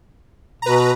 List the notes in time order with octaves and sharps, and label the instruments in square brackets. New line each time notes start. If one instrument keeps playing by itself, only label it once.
[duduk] B2 [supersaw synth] B4 A#5